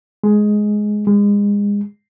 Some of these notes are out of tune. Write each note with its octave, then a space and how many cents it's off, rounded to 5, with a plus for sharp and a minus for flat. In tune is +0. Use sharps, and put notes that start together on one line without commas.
G#3 +10
G#3 -30